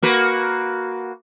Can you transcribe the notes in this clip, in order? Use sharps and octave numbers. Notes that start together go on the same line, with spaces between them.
A#3 F#4 B4